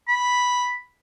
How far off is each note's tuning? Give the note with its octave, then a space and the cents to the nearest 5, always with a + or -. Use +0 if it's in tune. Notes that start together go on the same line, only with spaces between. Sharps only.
B5 -5